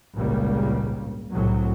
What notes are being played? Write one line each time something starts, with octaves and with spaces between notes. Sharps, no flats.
G#1 C#2 A#2 C#3 G3 A#3
C2 A2 F#3